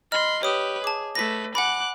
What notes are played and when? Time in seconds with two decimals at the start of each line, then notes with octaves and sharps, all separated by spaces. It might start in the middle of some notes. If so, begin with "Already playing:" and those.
0.12 D#5 B5 C6 F6
0.43 G4 B4 C#5 D#6
0.84 G#4 A5 D6
1.15 A3 B4 A#6 B6
1.55 F#5 G#5 B5 D6 F#6